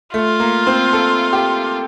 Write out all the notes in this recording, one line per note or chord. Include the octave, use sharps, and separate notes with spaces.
A3 F4
A#3
C4
A4
G4